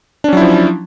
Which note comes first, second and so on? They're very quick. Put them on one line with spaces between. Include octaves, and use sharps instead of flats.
D4 C#4 F#3 E4 F3